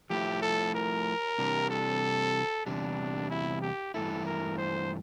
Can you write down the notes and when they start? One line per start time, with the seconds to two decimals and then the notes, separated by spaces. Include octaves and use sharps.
0.10 F3 A3 E4 G4
0.42 A4
0.75 A#4
1.38 C3 E3 G3 D4
1.70 A4
2.66 E2 C3 G3 D4
3.30 E4
3.62 G4
3.94 G2 E3 A3 E4 A4
4.26 A#4
4.58 C5